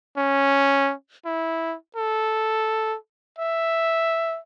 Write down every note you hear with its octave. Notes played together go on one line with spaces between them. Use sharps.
C#4
E4
A4
E5